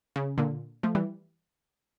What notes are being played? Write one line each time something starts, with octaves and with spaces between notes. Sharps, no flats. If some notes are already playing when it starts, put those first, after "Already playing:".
C#3
A#2 D3
F3 A3
E3 G3